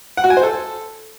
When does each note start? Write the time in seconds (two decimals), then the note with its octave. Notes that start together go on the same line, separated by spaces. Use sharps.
0.17 F#5
0.24 F#4
0.30 G#5
0.37 C5
0.43 A4